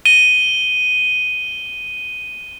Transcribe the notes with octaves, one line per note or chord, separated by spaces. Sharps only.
D#7 G7